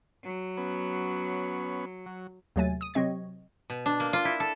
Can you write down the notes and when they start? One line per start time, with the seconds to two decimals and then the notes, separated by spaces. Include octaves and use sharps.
0.23 F#3
0.57 B3 C#4
2.06 F#3
2.56 D#2 C3 F#3 A3 G#5 A6
2.81 D#6 D#7
2.94 C3 F#3 C4 D#5 C#6 G#6
3.70 B2
3.86 D4
4.00 A#3
4.13 F4
4.25 E4
4.40 A4